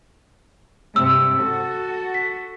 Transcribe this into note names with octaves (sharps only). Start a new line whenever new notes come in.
G2 C3 E6
F#4 A4
B6